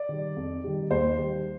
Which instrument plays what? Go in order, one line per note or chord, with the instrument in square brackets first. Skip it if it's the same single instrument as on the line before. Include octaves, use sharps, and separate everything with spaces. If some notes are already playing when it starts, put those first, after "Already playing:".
Already playing: [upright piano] D5
D#3 G3
F2
D#3 G3
D#2 C5
D#3 G3